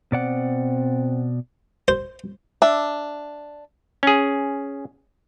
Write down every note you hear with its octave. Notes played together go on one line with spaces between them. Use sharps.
B2 C4 D5 F#5
C5
D4 E5
C#4 G#4